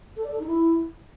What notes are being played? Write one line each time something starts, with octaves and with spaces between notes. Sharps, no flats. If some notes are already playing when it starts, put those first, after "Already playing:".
A4
D5
A4
D#4
E4